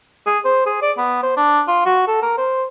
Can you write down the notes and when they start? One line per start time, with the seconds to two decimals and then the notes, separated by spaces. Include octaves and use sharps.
0.26 G#4
0.45 C5
0.66 G#4
0.82 D5
0.97 B3
1.23 C5
1.37 D4
1.68 F4
1.85 F#4
2.08 A4
2.22 A#4
2.38 C5